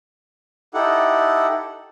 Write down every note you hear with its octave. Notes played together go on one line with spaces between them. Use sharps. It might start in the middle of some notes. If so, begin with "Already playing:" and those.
D#4 E4 G4 A4 F#5